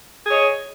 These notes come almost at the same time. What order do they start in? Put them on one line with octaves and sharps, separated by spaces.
G#4 C#5 D#5